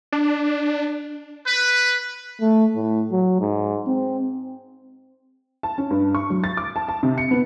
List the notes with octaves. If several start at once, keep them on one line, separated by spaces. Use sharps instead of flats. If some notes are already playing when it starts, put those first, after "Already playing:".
D4
B4
A3
A2
F#3
G#2
C4
A5
C#4
G2
C#6
F#3
A6
D6
A5
A5
C3
C#7
B3